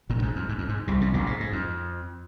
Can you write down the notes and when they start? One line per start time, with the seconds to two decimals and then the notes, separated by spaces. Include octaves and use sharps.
0.10 A#1 A#2
0.18 F2
0.22 G#2
0.36 F2
0.49 G#2
0.58 F2
0.69 G#2
0.87 C2 C3
1.01 C2 C3
1.13 A#1 A#2
1.27 G#2
1.40 G#2
1.53 F2